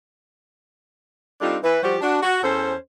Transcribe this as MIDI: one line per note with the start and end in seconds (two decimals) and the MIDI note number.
1.41 1.57 55
1.41 1.57 60
1.41 1.57 62
1.41 1.57 63
1.41 1.57 65
1.41 1.57 69
1.63 1.77 52
1.63 1.77 71
1.83 1.96 53
1.83 1.96 55
1.83 1.96 66
1.83 1.96 67
1.83 1.96 72
2.01 2.20 62
2.01 2.20 66
2.22 2.41 66
2.43 2.74 40
2.43 2.74 61
2.43 2.74 69
2.43 2.74 72